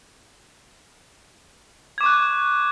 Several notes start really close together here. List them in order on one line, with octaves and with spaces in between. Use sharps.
G#6 D6 C#6 F#6